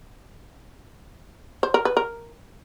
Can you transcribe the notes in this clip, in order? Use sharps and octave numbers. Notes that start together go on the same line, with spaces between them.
C5
A#4
B4
A#4